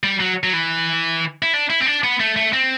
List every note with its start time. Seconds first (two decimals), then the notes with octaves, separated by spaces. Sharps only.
0.03 G3
0.20 F#3
0.43 F#3
0.53 E3
1.42 E4
1.54 D4
1.70 E4
1.82 C4
1.86 D4
2.04 B3
2.20 A3
2.36 A3
2.53 C4